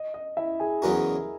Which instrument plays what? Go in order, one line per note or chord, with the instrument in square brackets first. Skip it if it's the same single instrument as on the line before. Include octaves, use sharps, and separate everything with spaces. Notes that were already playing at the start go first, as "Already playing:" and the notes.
Already playing: [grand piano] D#5
D#5
E4 E5
G#4 G#5
[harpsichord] E2 C#3 F#3 C#4 F#4 [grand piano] A#4 A#5